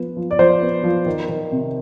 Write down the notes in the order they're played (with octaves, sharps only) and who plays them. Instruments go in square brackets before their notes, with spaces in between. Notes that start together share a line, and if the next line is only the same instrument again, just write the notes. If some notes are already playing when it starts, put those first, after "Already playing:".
Already playing: [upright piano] F3 B3
F3
D5
F3 C5
B3
F3
D#3
D#3
C3